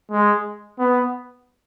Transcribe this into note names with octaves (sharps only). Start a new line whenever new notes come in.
G#3
B3